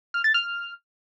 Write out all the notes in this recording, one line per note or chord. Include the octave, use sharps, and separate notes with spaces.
F6
A6
F6